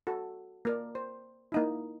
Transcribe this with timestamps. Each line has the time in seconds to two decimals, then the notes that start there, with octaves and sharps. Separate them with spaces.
0.07 F#4 A4
0.65 A#3 A#4 D5
0.95 C5
1.52 A#3 D#4 E4